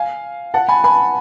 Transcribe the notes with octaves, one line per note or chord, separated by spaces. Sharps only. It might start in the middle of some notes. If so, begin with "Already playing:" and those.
Already playing: F5 G#5
F#5 A5
G#5 B5
G#5 B5